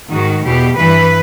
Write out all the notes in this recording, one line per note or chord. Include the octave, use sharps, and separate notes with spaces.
G#2 D#3 F#4
E2 B2 G4
G2 E3 B4